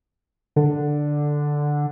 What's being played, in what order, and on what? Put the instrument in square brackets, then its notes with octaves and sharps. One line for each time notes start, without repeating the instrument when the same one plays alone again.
[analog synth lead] D3